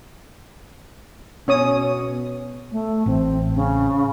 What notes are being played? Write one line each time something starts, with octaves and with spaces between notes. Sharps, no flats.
B2 C#4 C#5 D#6
A3
A1 C4
C#3